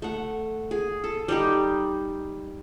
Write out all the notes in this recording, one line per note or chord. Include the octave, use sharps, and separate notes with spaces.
A3 F#5
G#4
A4
G3 D#4 G4